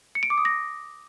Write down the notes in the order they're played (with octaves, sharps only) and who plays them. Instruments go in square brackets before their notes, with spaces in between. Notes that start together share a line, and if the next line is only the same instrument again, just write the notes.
[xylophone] C#7
D7
D6
D#6
A#6